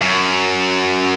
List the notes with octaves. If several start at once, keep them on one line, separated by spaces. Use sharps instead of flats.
F#2